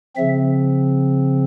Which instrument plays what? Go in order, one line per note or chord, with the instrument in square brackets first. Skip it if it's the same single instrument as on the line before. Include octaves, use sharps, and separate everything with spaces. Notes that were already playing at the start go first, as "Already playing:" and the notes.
[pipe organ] C#3 F3 C4 E5